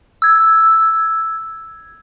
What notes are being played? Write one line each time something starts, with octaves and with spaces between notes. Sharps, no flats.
E6 G#6